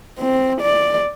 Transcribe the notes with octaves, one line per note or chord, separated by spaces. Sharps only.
C4
D5